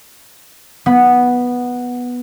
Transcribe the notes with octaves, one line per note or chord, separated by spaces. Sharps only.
B3